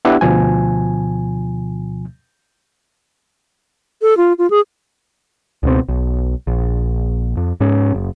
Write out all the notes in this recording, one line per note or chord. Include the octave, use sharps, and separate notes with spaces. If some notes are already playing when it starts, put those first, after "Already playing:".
B3 D4 E4 G4 F#5
D2 B2 F3 G#5
A4
F4
F4
G#4
C#2 B2 C4
B1
A#1
F2
G#2 C#4
F#1